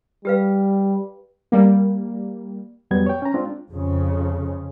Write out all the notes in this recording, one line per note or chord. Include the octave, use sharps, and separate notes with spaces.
G3 G4 B4 F5
G3 A#3
F2 F#3 G3 B3 G#6
C#5 G5
C#4 A#5
G#3 C4 D4 F4
F2 C#3